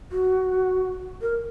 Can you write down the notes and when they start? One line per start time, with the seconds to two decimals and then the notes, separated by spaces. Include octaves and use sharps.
0.12 F#4
1.22 A#4